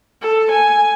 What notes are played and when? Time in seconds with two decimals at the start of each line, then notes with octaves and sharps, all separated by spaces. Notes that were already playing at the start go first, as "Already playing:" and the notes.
0.22 A4
0.51 G#5